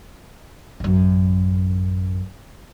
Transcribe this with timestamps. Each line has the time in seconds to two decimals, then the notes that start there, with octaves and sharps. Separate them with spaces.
0.80 A1 F#2